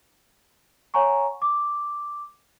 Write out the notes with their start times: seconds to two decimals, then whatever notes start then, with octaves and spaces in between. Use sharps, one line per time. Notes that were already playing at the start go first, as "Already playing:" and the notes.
0.94 C#5 F#5 G#5 A#5 C#6
1.42 D6